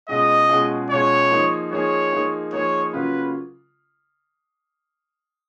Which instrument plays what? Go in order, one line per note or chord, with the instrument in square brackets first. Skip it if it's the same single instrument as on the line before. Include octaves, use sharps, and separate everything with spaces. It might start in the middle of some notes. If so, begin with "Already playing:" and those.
[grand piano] B2 G#3 C#4 F4 G#4 [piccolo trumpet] D#5
[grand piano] B2 G#3 C#4 F4 G#4
[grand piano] B2 G#3 C#4 F4 G#4 [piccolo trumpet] C#5
[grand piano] F3 A#3 D#4 G#4
[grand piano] F3 A#3 D#4 G#4 [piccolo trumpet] C#5
[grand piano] F3 A#3 D#4 G#4
[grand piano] F3 A#3 D#4 G#4 [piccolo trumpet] C#5
[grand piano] C#3 F#3 A#3 C#4 F4 [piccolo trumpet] B4